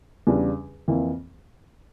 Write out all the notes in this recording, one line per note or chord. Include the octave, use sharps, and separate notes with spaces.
E2 C#3 G3 D4
F2 E3 A#3 E4